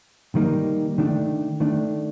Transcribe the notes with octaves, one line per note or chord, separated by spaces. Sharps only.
D#3 G3 A#3 D#4
D#3 A3 D4
D#3 A3 D4